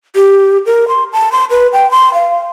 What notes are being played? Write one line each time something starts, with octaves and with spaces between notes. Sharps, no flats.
G4
A#4
C6
A5
C6
B4
G5
C6
F5